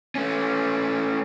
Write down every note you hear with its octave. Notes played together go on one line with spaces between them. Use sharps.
A3 C#4